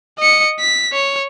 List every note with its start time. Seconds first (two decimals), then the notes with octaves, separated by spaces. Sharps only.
0.19 D#5 C#7
0.60 B6
0.92 C#5